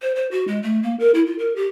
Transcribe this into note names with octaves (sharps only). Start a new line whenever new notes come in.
C5
C5
F#4
G#3
A3
A#3
A#4
E4
F4
A#4
G4